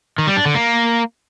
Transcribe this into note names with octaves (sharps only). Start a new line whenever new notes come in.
D#3
G3
D4
D3
A#3